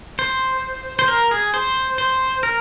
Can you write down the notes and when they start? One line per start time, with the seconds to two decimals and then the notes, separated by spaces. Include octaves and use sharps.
0.19 C5
0.99 C5
1.08 A#4
1.31 G#4
1.54 C5
1.98 C5
2.43 A#4